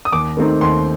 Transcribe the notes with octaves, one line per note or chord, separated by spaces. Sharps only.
D#6
D#2 D6
D#3 A3 C4 D#4
D#2 C6